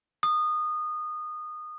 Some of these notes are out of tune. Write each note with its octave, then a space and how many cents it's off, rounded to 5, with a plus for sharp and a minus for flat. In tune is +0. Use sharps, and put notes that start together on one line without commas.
D#6 -20